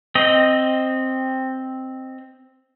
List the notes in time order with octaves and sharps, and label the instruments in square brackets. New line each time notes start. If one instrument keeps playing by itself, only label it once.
[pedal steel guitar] C4 D#5